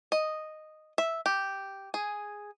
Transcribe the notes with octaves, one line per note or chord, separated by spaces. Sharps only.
D#5
E5
G4
G#4